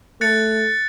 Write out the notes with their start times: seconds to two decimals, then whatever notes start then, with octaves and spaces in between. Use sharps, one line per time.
0.21 A3 F#6 A6 C#7